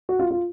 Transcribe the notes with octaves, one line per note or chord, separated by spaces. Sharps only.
F#4
F4
F4